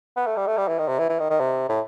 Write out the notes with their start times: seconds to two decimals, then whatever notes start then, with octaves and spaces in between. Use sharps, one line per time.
0.17 B3
0.27 A3
0.37 G3
0.47 A3
0.58 G3
0.68 E3
0.78 D#3
0.88 C3
0.99 E3
1.09 E3
1.19 D#3
1.30 D#3
1.40 C3
1.69 A2